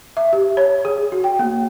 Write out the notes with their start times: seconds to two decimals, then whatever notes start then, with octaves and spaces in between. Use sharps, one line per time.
0.17 E5
0.33 G4
0.57 C#5
0.85 G#4
1.12 F#4
1.24 G5
1.39 A#3